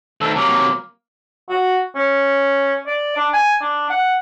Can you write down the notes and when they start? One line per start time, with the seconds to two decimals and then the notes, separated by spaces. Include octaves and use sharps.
0.21 D2 D#3 A4
0.36 C3 F#3 A#3
1.50 F#4
1.96 C#4
2.86 D5
3.17 D4
3.34 G#5
3.61 D4
3.90 F#5